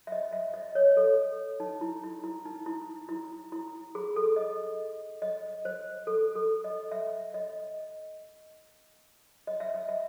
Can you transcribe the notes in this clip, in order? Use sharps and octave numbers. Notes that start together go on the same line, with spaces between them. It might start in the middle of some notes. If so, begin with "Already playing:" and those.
E5
D#5
E5
D#5
C#5
A4
D#4
E4
E4
E4
D#4
E4
E4
E4
G#4
A4
D#5
D#5
C5
A4
A4
D#5
E5
D#5
D#5
E5
D#5
E5